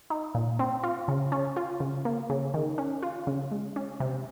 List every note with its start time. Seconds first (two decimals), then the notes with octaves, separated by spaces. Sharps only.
0.10 D#4
0.35 A#2
0.59 C4
0.83 F4
1.08 C#3
1.32 C#4
1.57 F4
1.80 C#3
2.05 A#3
2.30 C#3
2.54 D#3
2.78 C#4
3.03 F4
3.27 C#3
3.51 G#3
3.76 C#4
4.00 C3